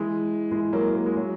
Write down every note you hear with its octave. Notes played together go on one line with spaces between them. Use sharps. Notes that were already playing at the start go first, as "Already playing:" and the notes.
Already playing: E3 G#3
E3 G#3
F#3 A#3
A#3
G#3
F#3